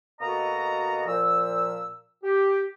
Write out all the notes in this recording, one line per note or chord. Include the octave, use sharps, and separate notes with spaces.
B2 A#3 F#4 A4 D#5 A#5
A#2 F3 E6
G4